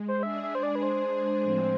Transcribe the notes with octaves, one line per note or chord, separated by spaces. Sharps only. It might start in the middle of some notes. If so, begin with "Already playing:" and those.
Already playing: G#3
C5
G#3 D4 G#4 E5
E5
C5
D5
B4
C5
A2 F3 G#3 C4